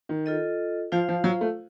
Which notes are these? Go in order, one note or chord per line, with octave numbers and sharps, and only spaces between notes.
D#3
F4 A4 D#5
F3 F4 C5 F5
F3
F#3
A3